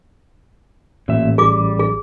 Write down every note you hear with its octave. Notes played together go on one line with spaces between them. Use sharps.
A1 A#2 E5
G3 G#4 D6
G#4